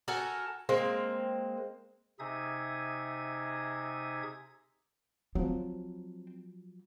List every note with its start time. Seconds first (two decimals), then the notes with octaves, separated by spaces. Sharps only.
0.08 F#4 A4 A#4 G#5
0.69 G#3 A#3 C4
2.19 C3 D#4 G#4 E5 D#6 G#6
5.35 F3 F#3 C4